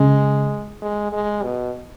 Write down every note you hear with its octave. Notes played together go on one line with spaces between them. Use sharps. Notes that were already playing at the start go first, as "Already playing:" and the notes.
Already playing: C#3 G#3
G#3
G#3
B2